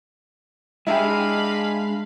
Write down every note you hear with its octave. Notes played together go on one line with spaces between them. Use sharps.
G#3 D4 E4 G4 G#4 F5 B5